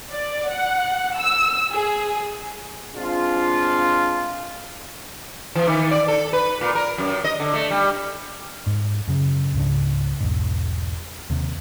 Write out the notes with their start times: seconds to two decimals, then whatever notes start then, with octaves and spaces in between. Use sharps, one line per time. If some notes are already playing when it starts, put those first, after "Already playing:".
0.12 D5
0.49 F#5
1.18 E6
1.72 G#4
2.95 G#3 C4 D4 F4
5.56 E3
5.67 D#3
5.91 D5
6.08 A4
6.33 B4
6.61 A#2
6.75 A#4
6.98 F#2
7.24 D#5
7.40 D3
7.54 A3
7.71 G3
8.67 G#2
9.07 F#2 C#3
9.54 C#2 G#2 C#3 D4
10.21 E1 B1 G#2
11.30 D#2 C3